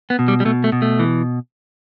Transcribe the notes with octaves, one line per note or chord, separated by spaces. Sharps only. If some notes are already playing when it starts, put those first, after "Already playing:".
B3
B2
G3
G3
B2 A3
A3
B2
A3
E3